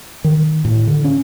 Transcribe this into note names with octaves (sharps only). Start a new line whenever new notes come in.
D#3
A2
D3
C#4